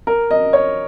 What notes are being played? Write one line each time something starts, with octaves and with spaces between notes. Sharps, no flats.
A#4
D#5
C#5